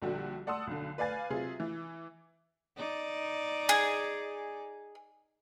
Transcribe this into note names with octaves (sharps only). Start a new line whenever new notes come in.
A#1 D3 G3 F#4 G4
D5 F#5 A5 C6 D#6 E6
B1 D3
B4 D5 F5 G#5 A6
C3 F#3 F4 G#4
E3
D#4 D5
G#4